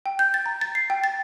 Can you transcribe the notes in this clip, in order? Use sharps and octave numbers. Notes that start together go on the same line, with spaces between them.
G5
G6
A6
A#5
A6
C7
G5
A6